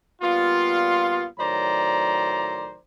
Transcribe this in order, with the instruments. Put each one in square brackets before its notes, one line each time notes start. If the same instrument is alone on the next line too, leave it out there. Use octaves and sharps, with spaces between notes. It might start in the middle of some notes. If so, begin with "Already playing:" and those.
[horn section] A#2 G3 B3 F4
A2 D#3 F#3 C5 D5 A#5